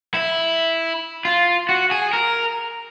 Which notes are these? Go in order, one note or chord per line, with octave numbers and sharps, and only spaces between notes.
E4
F4
F#4
G#4
A#4